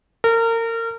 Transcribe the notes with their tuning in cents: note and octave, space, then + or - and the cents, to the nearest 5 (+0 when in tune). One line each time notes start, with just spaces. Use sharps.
A#4 -30